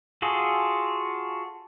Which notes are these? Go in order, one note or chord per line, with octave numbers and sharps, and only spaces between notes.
F4 F#4 G#4 A4